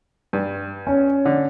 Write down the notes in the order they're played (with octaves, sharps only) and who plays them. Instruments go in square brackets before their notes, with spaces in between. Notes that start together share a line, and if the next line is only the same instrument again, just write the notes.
[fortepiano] G2
[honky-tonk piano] C#4
[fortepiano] D3